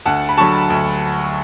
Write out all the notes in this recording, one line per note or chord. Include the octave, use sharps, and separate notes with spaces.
D2 F#5 A5
B5
D3 F#3 A5 C#6
D2